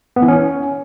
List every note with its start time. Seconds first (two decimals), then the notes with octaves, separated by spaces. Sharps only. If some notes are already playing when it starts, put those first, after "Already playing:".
0.16 B3
0.22 E3
0.28 C#4